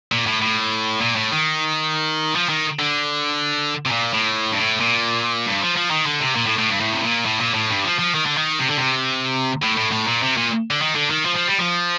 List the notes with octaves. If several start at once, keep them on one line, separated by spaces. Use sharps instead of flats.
A#2
A2
A2
A#2
A2
D#3
F3
D#3
D3
C3
A#2
A2
G2
A2
A#2
G2
F3
F3
D#3
D3
C3
A#2
A2
A2
G2
A2
C3
A#2
A2
A#2
A2
G2
F3
F3
D#3
D3
D#3
C3
D3
C3
A2
A2
A2
A#2
C3
A#2
D3
D#3
D3
D#3
F3
F3
G3
F3